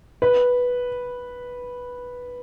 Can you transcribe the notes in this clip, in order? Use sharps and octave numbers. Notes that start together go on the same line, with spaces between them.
B4